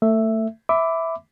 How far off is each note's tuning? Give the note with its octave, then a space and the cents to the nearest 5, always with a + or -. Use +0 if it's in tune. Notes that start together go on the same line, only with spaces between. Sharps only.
A3 +25 E5 +0
E5 -10 B5 +20 D6 +0